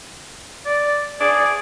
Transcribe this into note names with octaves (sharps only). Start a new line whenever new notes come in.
D5
G#4 D5